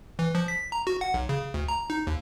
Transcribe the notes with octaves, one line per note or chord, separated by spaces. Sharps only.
E3
F3
B6
A#5
F#4
F#5
B1
C#3
D2
A#5
D#4
D#2